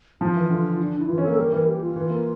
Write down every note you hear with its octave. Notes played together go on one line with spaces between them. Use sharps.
F3 F4
E3
D3
D4
E4
E3 F4
C#4
A#3 A4
G3 A#4
E3 A#4
G4
F4
E3
A#3